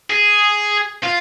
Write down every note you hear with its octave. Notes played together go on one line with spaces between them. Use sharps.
G#4
F4